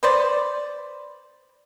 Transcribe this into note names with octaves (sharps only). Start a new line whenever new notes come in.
B4 C5 D5